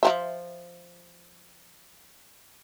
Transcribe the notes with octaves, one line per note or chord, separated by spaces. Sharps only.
F3 C5 E5